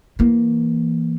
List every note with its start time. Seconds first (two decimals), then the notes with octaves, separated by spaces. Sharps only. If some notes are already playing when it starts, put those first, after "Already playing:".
0.19 E3 A#3